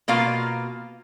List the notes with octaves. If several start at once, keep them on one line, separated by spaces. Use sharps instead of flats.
B2 A#3 F4 F5